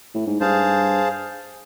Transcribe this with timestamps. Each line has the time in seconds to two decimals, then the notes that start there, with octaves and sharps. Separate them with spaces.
0.14 A2
0.27 G#2
0.40 G2 G#4 C5 F5 A5